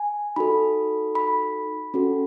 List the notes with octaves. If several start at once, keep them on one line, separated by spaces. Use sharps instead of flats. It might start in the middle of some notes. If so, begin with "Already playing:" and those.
Already playing: G#5
D#4 F#4 A4 B5
B5
C#4 F#4 A4